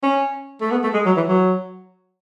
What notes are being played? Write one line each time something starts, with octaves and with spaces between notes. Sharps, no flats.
C#4
A3
B3
A3
G#3
F#3
E3
F#3